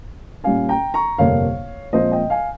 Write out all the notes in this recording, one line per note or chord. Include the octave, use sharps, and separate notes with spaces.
A#2 G3 C#4 F5 G#5
G5 A#5
A#5 C#6
G1 F2 C3 G3 A#3 C#5 F5
A#2 F3 G#3 C4 C5 D#5
D#5 G5
F5 G#5